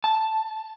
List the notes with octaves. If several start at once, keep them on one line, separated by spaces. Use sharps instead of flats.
A5